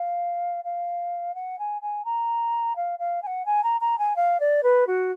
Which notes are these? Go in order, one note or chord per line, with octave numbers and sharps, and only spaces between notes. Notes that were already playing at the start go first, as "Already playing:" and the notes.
Already playing: F5
F5
F#5
G#5
G#5
A#5
F5
F5
G#5
F#5
G#5
A#5
A#5
G#5
F5
D5
B4
F#4